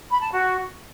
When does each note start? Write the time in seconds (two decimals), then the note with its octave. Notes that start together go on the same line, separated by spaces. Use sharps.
0.11 B5
0.21 A5
0.31 F#4